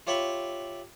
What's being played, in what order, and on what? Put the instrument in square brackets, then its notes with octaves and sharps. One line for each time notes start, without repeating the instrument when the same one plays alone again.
[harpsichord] F4 G4 C#5 E5 B5 C#6